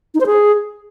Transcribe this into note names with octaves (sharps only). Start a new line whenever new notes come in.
D#4
C5
G#4